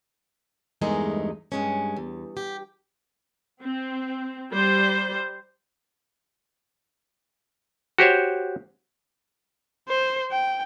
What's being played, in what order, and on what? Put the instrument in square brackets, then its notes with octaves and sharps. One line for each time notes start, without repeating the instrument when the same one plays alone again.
[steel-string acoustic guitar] E2 G2 G#3 A3 D#4 A#4
G2 G#3 C#4
E2
G4
[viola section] C4
G3 C5
[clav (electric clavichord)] F#4 G4 C5 C#5
[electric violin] C5
G5